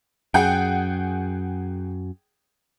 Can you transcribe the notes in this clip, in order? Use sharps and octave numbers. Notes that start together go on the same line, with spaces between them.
F#2 G#4 F#5 G5